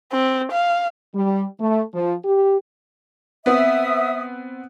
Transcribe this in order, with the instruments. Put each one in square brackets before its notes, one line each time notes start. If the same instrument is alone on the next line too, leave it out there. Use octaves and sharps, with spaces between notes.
[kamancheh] C4
F5
[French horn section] G3
A3
F3
G4
[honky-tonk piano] B3 C4 [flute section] E5 D#6